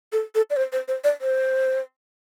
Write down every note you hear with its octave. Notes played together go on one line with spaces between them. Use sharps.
A4
A4
D5
C5
C5
C5
D5
C5